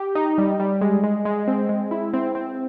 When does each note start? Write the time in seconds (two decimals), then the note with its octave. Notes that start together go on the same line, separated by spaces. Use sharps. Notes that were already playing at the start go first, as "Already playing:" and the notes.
Already playing: G4
0.15 D#4
0.38 G3
0.60 G3
0.81 G#3
1.04 G#3
1.25 G#3
1.48 C4
1.69 G#3
1.91 E4
2.14 C4
2.35 C4